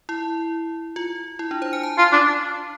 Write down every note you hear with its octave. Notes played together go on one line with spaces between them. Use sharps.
E4
F4
E4
D4
C5
G#5
A5
F4
D4